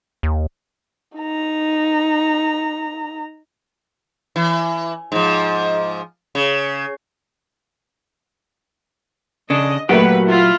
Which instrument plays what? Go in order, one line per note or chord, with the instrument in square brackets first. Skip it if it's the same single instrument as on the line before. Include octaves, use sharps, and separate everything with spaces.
[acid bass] D#2
[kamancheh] D#4 A#5
[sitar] E3
G#2 F3
C#3
[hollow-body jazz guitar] C#3 D4 [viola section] D#5
[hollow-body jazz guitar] A#2 F#3 G4 [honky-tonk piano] A3 A#3 F#4 [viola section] B4
[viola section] E4 F4